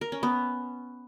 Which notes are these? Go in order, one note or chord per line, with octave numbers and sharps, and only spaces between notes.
A#4
C#4
B3